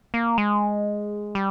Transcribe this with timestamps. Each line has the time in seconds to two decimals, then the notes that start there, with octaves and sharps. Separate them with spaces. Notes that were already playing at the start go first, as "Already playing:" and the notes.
0.14 A#3
0.38 G#3
1.35 G3